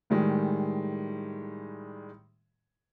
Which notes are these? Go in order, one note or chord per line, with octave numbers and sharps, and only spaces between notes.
A2 D#3 G3 G#3